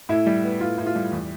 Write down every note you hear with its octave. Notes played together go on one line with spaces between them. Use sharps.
A2 E4
G3
B3
A2 F4
A2
F4
G3
E2